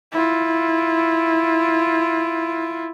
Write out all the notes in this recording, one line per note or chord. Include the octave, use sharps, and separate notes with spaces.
E4 F4